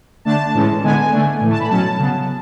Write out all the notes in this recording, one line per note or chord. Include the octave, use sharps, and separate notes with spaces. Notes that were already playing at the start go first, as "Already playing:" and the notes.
D3 A3 D4 A5
A2 E3 G#3 C#4
D3 G#3 B3 G#5
D3 A3 D4
A2 E3 A3
A5
B5
B2 F#3 C#4 A5
C#3 F#3 B3